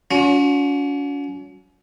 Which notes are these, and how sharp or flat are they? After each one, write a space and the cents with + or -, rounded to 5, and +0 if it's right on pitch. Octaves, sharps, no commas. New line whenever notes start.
C#4 +40 F#4 -40